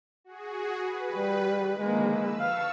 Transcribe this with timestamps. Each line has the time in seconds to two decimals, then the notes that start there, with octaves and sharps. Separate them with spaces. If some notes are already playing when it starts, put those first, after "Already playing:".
0.24 F#4 G#4
0.80 B4
1.14 G3
1.80 D3 D#3 F3 G#3 A#3
2.09 B4 E6
2.40 F5 A5 C#6 E6